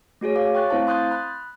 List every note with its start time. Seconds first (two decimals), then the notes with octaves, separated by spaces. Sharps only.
0.21 A3 F#4 G#4 C#5
0.36 C#5 F5 D6
0.54 G5 C#6 F#6 A6
0.70 A3 C4 E4 C5 F5 A5
0.87 C6 D#6 F#6 G6 A6
1.11 B5 F#6